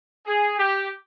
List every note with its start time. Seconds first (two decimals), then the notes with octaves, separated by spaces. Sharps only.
0.26 G#4
0.58 G4